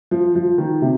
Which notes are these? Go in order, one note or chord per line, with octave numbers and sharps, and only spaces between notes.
F3
F3
D#3
C3